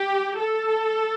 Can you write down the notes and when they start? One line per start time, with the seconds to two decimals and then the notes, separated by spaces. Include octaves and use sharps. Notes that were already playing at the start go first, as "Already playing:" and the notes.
Already playing: G4
0.38 A4